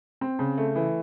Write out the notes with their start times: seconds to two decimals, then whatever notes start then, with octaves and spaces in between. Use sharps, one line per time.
0.21 C4
0.39 C#3
0.57 A3
0.76 E3